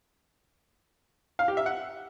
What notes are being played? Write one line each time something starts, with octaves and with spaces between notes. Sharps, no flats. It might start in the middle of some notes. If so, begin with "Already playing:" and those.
F5
G4
E5
F#5